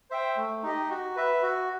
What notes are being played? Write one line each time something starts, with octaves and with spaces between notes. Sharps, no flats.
C5 E5 G5
A3
D#4 G4 D#5
F#4
B4 E5
F#4